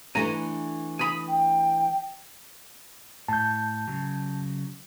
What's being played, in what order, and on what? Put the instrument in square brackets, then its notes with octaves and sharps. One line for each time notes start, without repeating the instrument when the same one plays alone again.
[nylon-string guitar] E3 A3 D4 [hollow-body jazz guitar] G#5 A#5
[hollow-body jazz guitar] G#5 B5 [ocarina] D#6
[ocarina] G5
[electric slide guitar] A2 [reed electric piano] A5 G6
[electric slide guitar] C#3 F#3